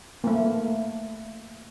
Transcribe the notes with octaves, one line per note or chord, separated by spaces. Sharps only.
A3 A#3